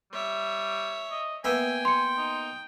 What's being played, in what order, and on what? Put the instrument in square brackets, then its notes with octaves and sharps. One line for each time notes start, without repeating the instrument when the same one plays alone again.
[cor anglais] G3 [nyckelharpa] C#5 E5
[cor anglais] D#5
[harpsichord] A#3 B3 E5 [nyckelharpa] G5 [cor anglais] G#5
[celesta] C6 C#7
[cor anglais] D#4